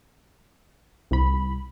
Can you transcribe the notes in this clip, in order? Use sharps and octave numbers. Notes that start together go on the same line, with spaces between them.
C2 B5